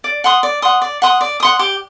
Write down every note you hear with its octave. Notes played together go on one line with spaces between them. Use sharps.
D5
F#5 C6 D#6
D5
F#5 C6 D#6
D5
F#5 C6 D#6
D5
F#5 C6 D#6
G4